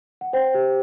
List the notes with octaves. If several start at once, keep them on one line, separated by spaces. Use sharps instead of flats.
F#5
C5 G5
G4